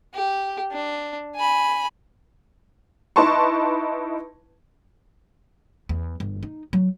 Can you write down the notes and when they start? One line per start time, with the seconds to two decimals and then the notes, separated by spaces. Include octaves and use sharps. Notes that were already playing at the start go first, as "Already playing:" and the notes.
0.14 G4
0.72 D4
1.35 G#5 B5
3.16 D#4 E4 B4 A5 C6 C#6
5.89 E2
6.20 G1
6.43 D#4
6.73 F#3